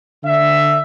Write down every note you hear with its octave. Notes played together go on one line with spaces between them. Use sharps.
D3 E5